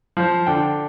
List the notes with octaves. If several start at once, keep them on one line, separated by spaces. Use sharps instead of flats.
F3 C5
D3 G5